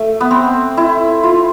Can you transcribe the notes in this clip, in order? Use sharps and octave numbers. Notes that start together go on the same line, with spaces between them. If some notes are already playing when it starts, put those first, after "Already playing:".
Already playing: A3
B3
C4
E4
F4